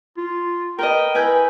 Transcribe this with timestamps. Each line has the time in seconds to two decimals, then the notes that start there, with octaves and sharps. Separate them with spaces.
0.17 F4
0.79 A#4 B4 D#5 G5
1.15 E4 B4 G#5 G6